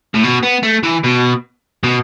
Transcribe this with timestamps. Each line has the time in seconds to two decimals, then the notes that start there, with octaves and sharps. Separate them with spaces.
0.14 A2
0.23 B2
0.43 B3
0.63 A3
0.83 E3
1.04 B2
1.84 B2